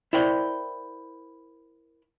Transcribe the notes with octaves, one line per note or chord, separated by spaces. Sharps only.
E4 A#4 C5 D5 G5